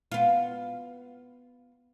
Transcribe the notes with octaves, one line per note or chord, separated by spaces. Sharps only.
B3 F4